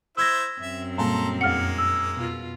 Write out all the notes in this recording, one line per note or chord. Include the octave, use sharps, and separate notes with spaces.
E4 C5 E5 E6 G#6 A#6
F#2 C4 E5
A#2 G3 A#3 A4 A#5 C6
F2 G#3 A#3 F#5 F6 C#7
E6
B2 F4